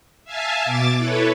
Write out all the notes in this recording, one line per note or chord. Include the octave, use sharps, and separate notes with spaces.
E5 F5 G#5 A5
B2 D6 A6
E4 A4 B4 C#5